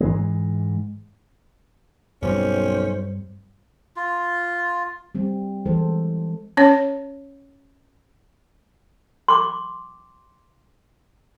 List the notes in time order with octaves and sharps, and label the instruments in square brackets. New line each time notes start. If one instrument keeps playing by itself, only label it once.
[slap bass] G#2 E3 G#3
[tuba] B1 [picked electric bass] G2 G3 C4 [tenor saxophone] C#4 [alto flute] C5
[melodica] F4
[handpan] G3 C4
E3 G#3 A4 C5
[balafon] C#4 C#5
[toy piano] C6 D6